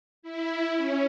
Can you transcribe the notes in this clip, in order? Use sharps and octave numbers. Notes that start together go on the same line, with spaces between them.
E4
C#4